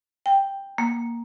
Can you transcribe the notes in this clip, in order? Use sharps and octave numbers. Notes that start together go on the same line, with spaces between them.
G5
A#3